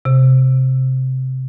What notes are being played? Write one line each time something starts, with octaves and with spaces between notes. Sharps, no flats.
C3